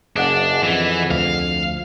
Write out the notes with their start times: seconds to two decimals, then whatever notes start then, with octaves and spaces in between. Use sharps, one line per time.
0.16 F#1 D4 G#4 D#5 F#5
0.63 F2 E3
1.11 D2 F5